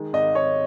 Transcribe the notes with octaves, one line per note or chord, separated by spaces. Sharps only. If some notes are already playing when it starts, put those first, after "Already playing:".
Already playing: D#3 G#3
G#1 D#5
G#1 C#5